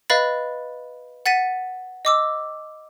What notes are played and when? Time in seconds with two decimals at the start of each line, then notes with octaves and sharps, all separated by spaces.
0.10 B4 D#5 F5 B5 A6
1.26 F#5 A6 B6 D#7
2.05 D#5 D6 E6